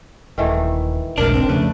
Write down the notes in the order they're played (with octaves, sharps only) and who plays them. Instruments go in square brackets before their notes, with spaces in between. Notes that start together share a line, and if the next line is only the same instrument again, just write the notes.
[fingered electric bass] D#1 [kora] D#3 E3 A3
[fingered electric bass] F1 B1 G#2 [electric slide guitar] D4 [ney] A#4
[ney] C4
[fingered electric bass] F2 C#3 [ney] A3 [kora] B4